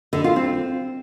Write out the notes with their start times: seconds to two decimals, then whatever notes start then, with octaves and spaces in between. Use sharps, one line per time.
0.13 D3
0.24 F4
0.36 C4